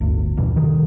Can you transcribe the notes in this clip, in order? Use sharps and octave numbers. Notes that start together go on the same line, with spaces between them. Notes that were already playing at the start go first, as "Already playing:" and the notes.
D1 G1 D2
E2 G2 B2
C3 D#3